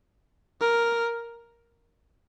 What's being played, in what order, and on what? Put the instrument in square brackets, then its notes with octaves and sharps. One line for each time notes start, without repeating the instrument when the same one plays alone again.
[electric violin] A#4